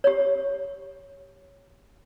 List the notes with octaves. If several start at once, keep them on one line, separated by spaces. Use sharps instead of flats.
G4 C#5